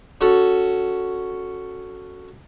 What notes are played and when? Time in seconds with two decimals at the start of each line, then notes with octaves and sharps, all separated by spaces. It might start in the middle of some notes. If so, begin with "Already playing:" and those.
0.21 C#4 F#4 A4 F#5